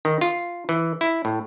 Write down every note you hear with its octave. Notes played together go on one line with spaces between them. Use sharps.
D#3
F4
E3
E4
A2